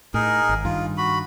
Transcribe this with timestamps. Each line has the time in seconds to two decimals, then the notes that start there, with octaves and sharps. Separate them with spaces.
0.14 A2 D#4 G#4 A#4
0.49 G#1
0.65 G2 D#3 F4
0.97 F#4 B5